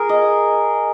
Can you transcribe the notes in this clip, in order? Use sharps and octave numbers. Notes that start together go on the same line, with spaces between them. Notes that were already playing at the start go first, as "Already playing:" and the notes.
Already playing: G#4 A#4
D#5